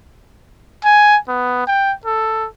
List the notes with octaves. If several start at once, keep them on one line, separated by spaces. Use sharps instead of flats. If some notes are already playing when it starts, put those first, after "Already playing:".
G#5
B3
G5
A4